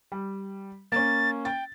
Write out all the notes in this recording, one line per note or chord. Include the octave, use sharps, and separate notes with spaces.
G3
A#3 C#4 A6
G5 A6